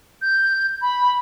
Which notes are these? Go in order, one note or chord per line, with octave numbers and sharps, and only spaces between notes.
G6
B5